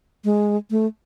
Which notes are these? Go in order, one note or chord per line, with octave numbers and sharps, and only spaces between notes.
G#3
A3